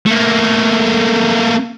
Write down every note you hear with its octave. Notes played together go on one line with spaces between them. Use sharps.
A3 A#3